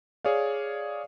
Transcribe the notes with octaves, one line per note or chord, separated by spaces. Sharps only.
G#4 C#5 D5 F5